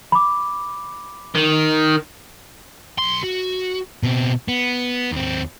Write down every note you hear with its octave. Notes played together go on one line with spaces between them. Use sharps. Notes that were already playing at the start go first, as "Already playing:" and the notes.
B5 D6
D#3
B1 C6
F#4
B2 C4
B3
D#2 C4